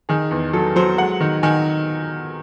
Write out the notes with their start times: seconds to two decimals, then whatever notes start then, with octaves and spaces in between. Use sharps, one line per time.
0.09 D#3 G#4
0.31 E2
0.53 F#3 A4
0.76 F#3 C5
0.98 G#3 F#5
1.20 D#3
1.43 D#3 G#5